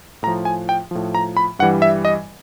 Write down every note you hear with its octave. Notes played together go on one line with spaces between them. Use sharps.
A2 F3 A#5
G#5
G5
A2 F3
A#5
B5
G2 E3 G3 F#5
E5
D#5